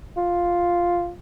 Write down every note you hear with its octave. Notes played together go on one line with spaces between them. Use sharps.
F4